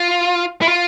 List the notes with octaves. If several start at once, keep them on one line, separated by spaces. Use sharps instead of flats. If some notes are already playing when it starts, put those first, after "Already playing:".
Already playing: F4
E4
F4